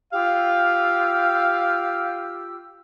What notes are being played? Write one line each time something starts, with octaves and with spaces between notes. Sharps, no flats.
F4 G4 F5 E6